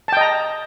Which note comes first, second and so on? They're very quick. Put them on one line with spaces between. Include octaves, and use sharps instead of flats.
A5 G5 D#5 A#5